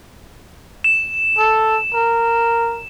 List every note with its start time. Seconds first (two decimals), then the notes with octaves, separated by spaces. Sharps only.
0.84 E7
1.38 A4
1.94 A#4